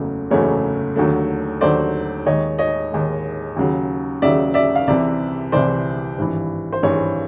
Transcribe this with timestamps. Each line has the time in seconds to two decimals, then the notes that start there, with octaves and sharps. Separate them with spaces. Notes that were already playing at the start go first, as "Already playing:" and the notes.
Already playing: F#1 E2 C#3 F#3 A3
0.31 F#1 E2 C#3 F#3 A3 C#5
0.96 D#2 D3 F#3 A3
1.61 D#2 D3 F#3 A3 C5 D5
2.26 D#2 D#3 G#3 C#5 D#5
2.59 C#5 D#5
2.92 D#2 D#3 G#3
3.56 D#2 C#3 F#3
4.22 D#2 C#3 F#3 D5 E5
4.54 D5 E5
4.76 F5
4.87 C2 C3 E3 D5 E5
5.52 C2 C3 E3 C5 D5
6.18 G#1 G2 E3
6.73 C5
6.83 G#1 G2 E3 C#5